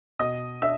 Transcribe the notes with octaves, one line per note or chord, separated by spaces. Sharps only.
B2 D#5 D#6
D4 E5 E6